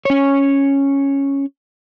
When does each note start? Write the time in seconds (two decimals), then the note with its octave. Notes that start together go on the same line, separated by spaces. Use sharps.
0.05 C#4 C#5